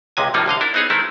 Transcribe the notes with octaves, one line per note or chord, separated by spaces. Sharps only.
C#2 C3 G#3 G#5
A2 C3 F3 G3 A#3 D#4
C2 D3 D#5 F5
D4 E4 A#4
B3 C4 D#4 G#4 C#5
D#3 G#3 A3 C4 E4